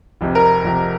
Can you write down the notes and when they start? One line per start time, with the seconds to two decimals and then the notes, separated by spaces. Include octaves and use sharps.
0.21 F1 F2 C3
0.35 A#4
0.64 F1 F2 C3